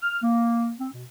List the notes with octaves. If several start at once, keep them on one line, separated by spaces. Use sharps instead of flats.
F6
A#3
C4
B2